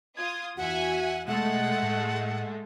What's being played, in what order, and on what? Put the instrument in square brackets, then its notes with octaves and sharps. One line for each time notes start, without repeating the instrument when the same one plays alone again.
[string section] F4 D#6 [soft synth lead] G#6
[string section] E2 E5 G#5 [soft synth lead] F#4 [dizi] F#5
[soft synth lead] B2 [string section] G#3 A3 [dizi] F#5
[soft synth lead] A2